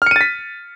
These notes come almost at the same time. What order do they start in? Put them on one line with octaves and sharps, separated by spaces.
F6 C#7 D#7 A6 B6